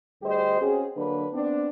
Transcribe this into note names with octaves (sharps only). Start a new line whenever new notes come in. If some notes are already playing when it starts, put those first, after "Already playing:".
D2 G3 G4 G#4 C5 D#5
C4 C#4 F#4 G#4
D3 F#3 A#3 D4 B4
B3 C4 D4